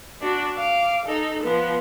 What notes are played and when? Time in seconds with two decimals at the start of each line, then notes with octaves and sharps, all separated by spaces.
0.21 D4 F#4
0.55 F5 D6
1.05 D#4 A4
1.43 F3 B3